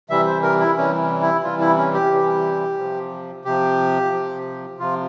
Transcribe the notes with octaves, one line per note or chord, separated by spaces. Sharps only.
C3 E3 G3 E5
C5
A#4
E4
C3 E3 G3 C#4
E4
C3 E3 G3 F4
E4
C#4
G4
C3 E3 G3
C3 F3
C3 F3 G4
C3 F3
C3 F3 F4